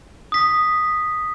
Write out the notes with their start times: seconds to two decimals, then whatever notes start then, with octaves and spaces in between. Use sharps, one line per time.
0.32 D#6 B6